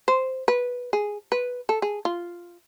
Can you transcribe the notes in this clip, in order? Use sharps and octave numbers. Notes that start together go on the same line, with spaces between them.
C5
B4
G#4
B4
A4
G#4
F4